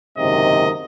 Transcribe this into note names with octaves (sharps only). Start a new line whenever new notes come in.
F#1 G#2 C3 D#3 D#5